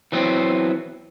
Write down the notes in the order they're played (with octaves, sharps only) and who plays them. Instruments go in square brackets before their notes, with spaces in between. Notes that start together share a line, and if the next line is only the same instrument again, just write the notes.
[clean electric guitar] E3 F#3 B3 C4